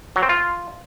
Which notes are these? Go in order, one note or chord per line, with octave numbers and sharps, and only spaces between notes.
F#3
C4
F4